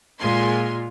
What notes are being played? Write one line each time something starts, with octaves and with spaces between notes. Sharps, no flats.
A#2 G#3 F4 G#5 C6